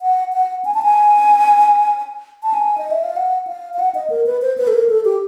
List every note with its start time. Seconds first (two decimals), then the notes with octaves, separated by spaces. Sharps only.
0.02 F#5
0.33 F#5
0.65 G#5
0.74 A5
0.82 G#5
2.43 A5
2.54 G#5
2.78 D#5
2.91 E5
3.03 F5
3.16 F#5
3.47 F5
3.74 F5
3.79 F#5
3.95 D#5
4.10 A#4
4.26 B4
4.42 C5
4.58 B4
4.67 A4
4.74 A#4
4.89 A4
5.05 G4